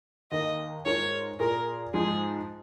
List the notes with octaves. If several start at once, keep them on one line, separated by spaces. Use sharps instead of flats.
D#2 D#3 A#3 D#5
G#2 G#3 F4 A#4 C#5
A#2 A#3 F4 G#4 A#4
G#2 F3 G#3 D#4 G#4